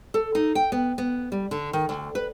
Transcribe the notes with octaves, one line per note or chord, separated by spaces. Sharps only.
A4
D#4
G5
B3
B3
G3
D3
D#3
D2
B4